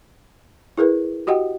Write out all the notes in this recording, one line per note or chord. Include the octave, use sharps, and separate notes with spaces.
E4 G#4 A#4 B4
F#4 G4 D#5 F#5 G5